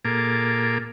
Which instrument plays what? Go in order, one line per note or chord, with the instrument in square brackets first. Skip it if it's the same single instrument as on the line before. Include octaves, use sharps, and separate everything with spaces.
[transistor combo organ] A#2 A#3 G#4 A4 D6